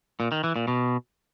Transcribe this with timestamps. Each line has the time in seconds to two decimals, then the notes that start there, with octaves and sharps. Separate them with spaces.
0.20 A#2
0.32 D#3
0.44 E3
0.56 A#2
0.68 B2